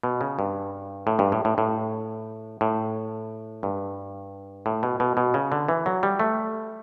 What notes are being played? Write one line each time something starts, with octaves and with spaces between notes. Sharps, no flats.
B2
C#3
G2
A2
G2
A2
A2
A2
A2
G2
A2
B2
B2
B2
C#3
D3
E3
F#3
G3
A3